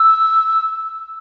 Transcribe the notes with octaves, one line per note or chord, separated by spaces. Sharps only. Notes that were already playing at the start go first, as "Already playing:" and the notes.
Already playing: E6